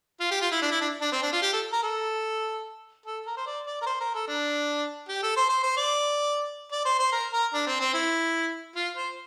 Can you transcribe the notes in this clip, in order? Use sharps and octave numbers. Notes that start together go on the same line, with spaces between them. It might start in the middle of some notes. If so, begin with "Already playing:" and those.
F4
G4
F4
E4
D4
E4
D4
D4
C4
D4
F4
G4
A4
A#4
A4
A4
A#4
C5
D5
D5
A#4
C5
A#4
A4
D4
G4
A4
C5
C5
C5
D5
D5
C5
C5
A#4
A#4
D4
C4
C4
E4
F4
C5